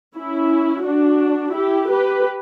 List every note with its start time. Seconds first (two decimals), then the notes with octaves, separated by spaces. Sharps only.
0.16 C#4 E4
0.85 D4 F#4
1.54 E4 G4
1.90 G4 B4